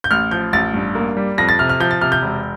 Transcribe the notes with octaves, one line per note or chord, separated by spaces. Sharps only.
G6
A1 F6
F3 G6
A1 A6
G2
A#3
G3
F2 A#6
A6
C3 F6
F6
F3 G6
A6
C3 F6
G6
E1